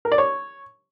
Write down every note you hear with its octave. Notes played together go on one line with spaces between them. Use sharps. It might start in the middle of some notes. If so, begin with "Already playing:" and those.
A#4
D5
C#5